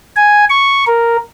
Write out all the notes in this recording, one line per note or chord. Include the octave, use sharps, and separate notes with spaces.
G#5
C#6
A#4